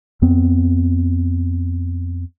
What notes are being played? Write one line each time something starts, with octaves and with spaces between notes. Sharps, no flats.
F2 B3 C4